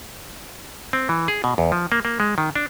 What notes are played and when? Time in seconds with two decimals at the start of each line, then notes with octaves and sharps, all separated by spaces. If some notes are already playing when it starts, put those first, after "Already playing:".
0.93 C4
1.09 E3
1.28 G#4
1.44 B2
1.58 E2
1.72 F3
1.92 A#3
2.05 A#3
2.20 G#3
2.38 D#3
2.56 D4